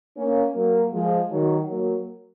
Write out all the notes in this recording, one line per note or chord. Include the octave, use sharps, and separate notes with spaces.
A#3 C#4
F#3 A#3
F3 G#3
D#3 F#3
F#3 A#3